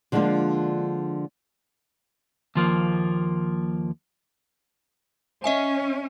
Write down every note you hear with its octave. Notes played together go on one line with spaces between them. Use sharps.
D3 F3 G#3 A#3 D4 F4
D#2 F3 A#3
C#4 D#5 E5 G#5